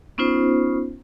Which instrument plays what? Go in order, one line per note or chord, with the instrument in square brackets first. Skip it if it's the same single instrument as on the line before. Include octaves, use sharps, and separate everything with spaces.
[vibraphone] B3 C#4 D#4 F4 C5